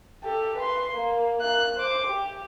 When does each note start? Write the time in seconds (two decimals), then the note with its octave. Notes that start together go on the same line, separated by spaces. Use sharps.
0.24 G4 A4
0.57 B4 C6
0.92 A#3
1.41 A#3 F#6
1.77 C5 D6
2.07 G4